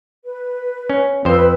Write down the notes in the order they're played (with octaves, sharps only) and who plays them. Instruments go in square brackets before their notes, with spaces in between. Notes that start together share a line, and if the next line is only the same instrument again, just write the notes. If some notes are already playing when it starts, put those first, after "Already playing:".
[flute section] B4
[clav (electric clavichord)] C#4
[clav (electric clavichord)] F2 C5 [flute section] B4 E6